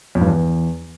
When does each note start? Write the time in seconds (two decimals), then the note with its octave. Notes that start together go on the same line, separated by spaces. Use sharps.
0.15 F2
0.21 G2
0.27 E2